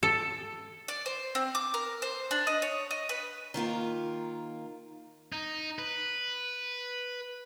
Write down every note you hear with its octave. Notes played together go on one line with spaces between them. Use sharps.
A4
D5
C5
C4
D6
A#4
C5
D4
D#5
C#5
D#5
B4
D#3 A#3 F4 A#4
D#4
B4